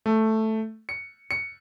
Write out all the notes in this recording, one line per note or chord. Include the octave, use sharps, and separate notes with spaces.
A3
C#7
C#7